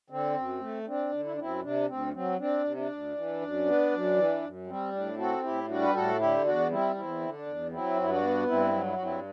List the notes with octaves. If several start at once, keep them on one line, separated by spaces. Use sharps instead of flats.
D3 C4
F#2
A3
C4 D4
D3
E4
D4
F#2 C4 E4
C3 D4
D2 C4
F#3 C4
C4 D4
C3
D4
D2
E3
F#2
B3
F#2
E3
F#2
G3 C4
A2 D4
C4 F#4 A4
A2 E4 G4
G3 D4 F#4
B4
A2 F#4 A4
D3 E4 G4
E2 D4 F#4
G3 C4 E4
E2 C4 E4
D3
D4
E2
F#3 C4 E4
G2 E4
D4 F#4
B3
G2 C4 E4
F#3
E4
F#4
G2 C4 E4